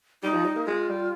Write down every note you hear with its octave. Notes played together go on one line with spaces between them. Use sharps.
G3 D#4
F3
G3
A#3
G#3 F4
G3